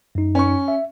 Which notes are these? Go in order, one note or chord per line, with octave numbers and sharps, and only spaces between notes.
F#2 D#4
C#4 C#6
E5